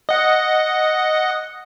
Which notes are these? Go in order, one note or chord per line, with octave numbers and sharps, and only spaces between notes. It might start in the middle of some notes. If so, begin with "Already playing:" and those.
D#5 F#5